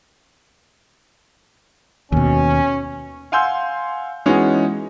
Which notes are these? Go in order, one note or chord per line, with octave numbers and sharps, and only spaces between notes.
D#2 B2 C#4
F5 F#5 G#5 C6 E6 G6
E3 G#3 B3 C#4 D#4 F#4